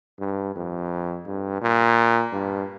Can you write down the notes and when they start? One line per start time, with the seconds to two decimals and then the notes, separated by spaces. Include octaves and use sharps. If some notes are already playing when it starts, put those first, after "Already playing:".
0.20 G2
0.56 F2
1.27 G2
1.62 A#2
2.32 G2